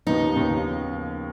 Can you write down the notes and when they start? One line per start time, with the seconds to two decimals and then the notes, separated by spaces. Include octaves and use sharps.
0.07 D#2 C#3 F3 B3 D#4
0.35 D#2 C#3 F3 B3